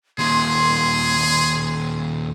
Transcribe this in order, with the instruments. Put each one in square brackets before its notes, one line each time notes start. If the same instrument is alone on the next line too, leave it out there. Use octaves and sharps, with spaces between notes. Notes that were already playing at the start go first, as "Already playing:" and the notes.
[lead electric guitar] D#2 A#2 [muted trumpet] G#4 [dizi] C6